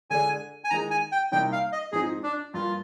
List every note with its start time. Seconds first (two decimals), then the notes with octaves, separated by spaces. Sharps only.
0.10 D3 G#3 D4 G#5
0.64 G#5
0.70 D#3 G#3 D#4 A#5
0.91 G#5
1.12 G5
1.32 C3 G3 A#3 D#4 G5
1.52 F5
1.72 D#5
1.92 G#2 F3 C4 D#4 G#4
2.23 D4
2.54 G2 F3 A#3 F4